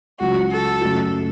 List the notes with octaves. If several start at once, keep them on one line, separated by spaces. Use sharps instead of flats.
C#2 C#3 F#3 F#4
A4
F#2 C#3 A3 F#4